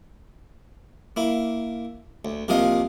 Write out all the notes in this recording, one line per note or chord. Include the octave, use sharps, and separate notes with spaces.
A#3 E4
D2
C2 C3 F3 A#3 D#5 F5